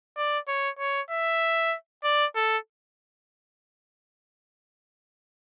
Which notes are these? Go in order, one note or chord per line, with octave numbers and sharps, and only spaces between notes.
D5
C#5
C#5
E5
D5
A4